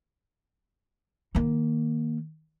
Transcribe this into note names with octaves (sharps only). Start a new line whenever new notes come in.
D#3 A#3